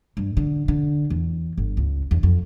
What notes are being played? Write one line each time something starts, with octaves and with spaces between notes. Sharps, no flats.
G2
D3
D3
E2
G1
C#2
E2
F2